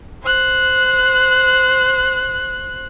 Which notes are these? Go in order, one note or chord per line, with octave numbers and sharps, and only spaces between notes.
C5 F#6